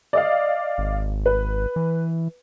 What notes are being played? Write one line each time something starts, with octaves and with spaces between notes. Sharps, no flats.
D5 D#5 F5
G#1
B4
E3